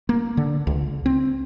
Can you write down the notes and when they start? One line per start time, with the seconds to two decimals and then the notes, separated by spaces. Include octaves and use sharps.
0.09 A#3
0.37 D3
0.67 C#2
1.06 C4